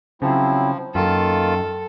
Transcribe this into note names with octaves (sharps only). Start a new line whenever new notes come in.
C#3 F3 F#3 C4 E4
F#2 D#3 A#3 F4 A4